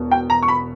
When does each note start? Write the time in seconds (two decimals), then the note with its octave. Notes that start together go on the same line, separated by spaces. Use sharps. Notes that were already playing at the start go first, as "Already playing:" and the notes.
Already playing: E1 E2 B2
0.11 G5
0.30 A#5
0.43 C#6
0.48 B5